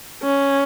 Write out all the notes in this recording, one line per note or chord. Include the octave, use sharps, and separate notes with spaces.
C#4